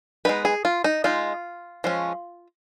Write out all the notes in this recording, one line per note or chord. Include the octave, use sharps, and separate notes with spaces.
G#3 B3 D#4 B4
G#4
F4
D#4
G#3 D#4 F4
F3 G#3 C#4